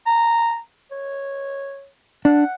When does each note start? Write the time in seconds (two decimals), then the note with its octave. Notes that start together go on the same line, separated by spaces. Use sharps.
0.07 A#5
0.91 C#5
2.25 D4 F#5